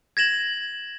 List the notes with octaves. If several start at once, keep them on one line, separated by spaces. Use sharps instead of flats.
G#6 A#6 E7 F#7